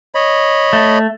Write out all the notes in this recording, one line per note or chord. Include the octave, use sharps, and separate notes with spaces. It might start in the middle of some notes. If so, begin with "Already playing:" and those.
C#5 D#5 B5
A3